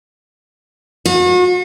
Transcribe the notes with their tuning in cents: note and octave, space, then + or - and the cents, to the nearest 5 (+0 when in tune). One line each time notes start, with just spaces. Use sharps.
F#4 -40